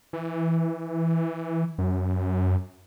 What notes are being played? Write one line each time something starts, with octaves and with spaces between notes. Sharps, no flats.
E3
F#2